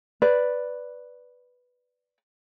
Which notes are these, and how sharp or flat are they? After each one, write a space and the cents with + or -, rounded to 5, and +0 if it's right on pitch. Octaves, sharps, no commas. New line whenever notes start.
B4 +0 D5 +0